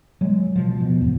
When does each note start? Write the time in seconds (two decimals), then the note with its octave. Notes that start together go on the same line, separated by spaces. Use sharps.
0.21 F#3 G#3
0.56 B2 F3
0.81 B2
1.01 G#1 E2